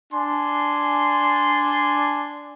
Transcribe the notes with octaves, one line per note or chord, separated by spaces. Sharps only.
D4 G#5 C6